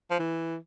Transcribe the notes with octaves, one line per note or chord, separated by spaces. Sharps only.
F3
E3